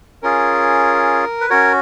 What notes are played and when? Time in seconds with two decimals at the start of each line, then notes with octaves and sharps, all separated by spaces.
0.22 C#4 F4 G#4 A#4
1.41 B4
1.50 C#4 F#4 A#4 C#5